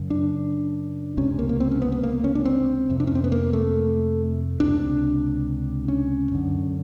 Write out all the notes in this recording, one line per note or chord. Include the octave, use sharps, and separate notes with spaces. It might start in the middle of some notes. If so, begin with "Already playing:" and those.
Already playing: F#2 C#3
D4
C#2 C3 C#4
A#3
A#3
C4
C#4
B3
B3
A#3
C#4
D4
C4
F2 C3
D4
C#4
C4
B3
A#3
A3
C#2 C3 D4
C#4
F#2 D3